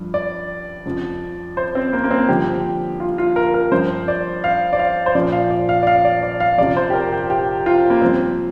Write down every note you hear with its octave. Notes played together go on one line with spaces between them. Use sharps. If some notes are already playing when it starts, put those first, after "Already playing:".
Already playing: G2 F3
D5
F2 F3
C5
C4
A#3
A#3
C4
G2 D3 F3 G4
F4
F4
A#4
A#4
G2 F3 C5
D5
F5
D5
F5
C5
A#2 F3 D5
F5
D5
F5
D5
F5
D5
D5
F5
F2 C3 F3 D5
C5
G4
A#4
G4
G4
F4
A#3
G2 F3 C4